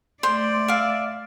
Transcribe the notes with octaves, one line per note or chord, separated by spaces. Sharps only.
A3 C5 D5
E5 F5